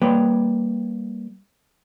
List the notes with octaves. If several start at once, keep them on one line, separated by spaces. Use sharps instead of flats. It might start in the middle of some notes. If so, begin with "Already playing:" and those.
G3 A#3 B4 C#5 G5